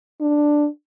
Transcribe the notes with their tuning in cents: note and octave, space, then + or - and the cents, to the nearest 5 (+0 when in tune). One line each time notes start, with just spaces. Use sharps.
D4 +5